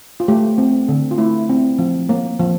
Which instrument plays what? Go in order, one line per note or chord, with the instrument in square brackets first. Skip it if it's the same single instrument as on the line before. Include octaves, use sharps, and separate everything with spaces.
[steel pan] F4
A3 G4
C4
D3
F4
A3 E4
C4
F3
A#3
F3